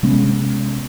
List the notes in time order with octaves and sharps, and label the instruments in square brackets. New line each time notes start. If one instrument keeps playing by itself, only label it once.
[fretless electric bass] C3 G#3 B3 C#4